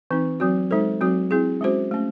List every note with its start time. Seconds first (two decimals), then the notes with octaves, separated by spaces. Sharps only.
0.11 E3 C4 D#4
0.40 F#3 C4 F#4
0.71 G#3 D#4 A4 C5
1.01 F#3 C4 F#4
1.31 C4 E4 G#4
1.61 G#3 C#4 F#4 C5
1.91 A3 C#4